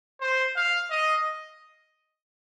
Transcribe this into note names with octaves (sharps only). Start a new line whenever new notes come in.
C5
F5
D#5